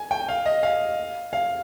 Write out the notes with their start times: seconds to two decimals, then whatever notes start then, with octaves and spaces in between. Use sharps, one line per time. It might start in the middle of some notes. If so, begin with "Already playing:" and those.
Already playing: G#5
0.11 G5
0.29 F5
0.46 D#5
0.63 F5
1.33 F5